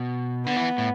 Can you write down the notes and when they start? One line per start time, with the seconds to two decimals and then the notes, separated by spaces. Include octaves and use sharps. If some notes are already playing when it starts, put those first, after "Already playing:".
Already playing: B2
0.46 D3 B3
0.56 E3
0.78 A2